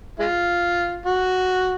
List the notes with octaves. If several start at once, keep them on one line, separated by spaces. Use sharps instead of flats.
G#3 F4
F#4